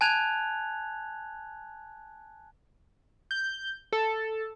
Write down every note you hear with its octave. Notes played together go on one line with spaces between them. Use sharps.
G#5 A5 F#6 G#6 F7
G6
A4